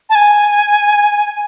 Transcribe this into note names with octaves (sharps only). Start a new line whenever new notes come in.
A5
G#5